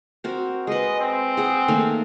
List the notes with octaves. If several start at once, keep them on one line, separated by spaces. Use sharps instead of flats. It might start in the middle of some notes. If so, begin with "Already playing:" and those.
C4 F#4 A#4
G#3 B4 D#5
C4
G#4 F#5
D#3 A3 A#3